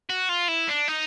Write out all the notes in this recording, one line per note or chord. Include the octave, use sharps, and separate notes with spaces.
F#4
F4
E4
D4
D#4